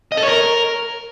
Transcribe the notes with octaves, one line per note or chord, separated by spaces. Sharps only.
D#5
A4
C#5
A#4